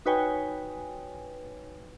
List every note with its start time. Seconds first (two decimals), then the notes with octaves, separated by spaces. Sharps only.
0.06 D#4 F#4 B4 C#5 G5 G#5